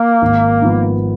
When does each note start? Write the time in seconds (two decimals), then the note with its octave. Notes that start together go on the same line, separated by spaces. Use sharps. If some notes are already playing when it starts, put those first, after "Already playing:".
Already playing: A#3
0.22 G#1
0.62 G#2 F3 B3